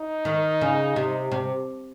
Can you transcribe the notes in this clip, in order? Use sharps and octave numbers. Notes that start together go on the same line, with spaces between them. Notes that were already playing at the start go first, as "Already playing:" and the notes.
Already playing: D#4
D#3
C#3
C3
C3